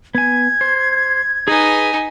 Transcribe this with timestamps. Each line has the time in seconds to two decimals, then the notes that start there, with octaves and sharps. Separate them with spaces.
0.15 B3 G#5 G#6
0.61 C5
1.48 D#4 G#4 B4 G#5